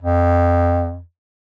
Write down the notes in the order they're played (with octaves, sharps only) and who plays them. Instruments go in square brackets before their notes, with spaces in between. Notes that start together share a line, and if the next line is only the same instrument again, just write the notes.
[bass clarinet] F2